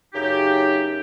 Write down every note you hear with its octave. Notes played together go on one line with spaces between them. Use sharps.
F#2 C#3 D#4 G4